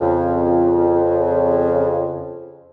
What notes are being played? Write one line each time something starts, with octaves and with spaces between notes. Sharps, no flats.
F2 C#3